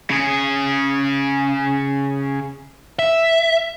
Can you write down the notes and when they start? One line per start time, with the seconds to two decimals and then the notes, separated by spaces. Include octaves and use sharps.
0.10 C#3 G#4
2.99 E5